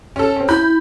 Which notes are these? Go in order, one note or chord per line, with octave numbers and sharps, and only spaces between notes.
C#4 A4
C4 C#4
E4 B5 G6